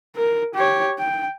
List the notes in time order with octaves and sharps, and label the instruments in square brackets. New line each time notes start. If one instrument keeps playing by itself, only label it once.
[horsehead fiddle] A#4
G4 C#5
G5